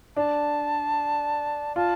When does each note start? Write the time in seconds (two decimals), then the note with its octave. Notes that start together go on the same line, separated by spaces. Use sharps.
0.16 D4 A5
1.76 F4 A5